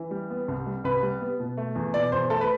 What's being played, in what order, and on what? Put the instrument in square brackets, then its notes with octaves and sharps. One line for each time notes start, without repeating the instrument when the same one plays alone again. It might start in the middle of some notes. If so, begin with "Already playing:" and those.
Already playing: [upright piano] E3
G3
B3
C2
G3
C2 B4
G3
B3
B2
A3
E2
B2 D5
E2 C5
A3 A4
B4